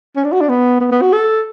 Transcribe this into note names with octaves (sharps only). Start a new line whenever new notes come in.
C#4
D4
F#4
D4
B3
B3
B3
F#4
A4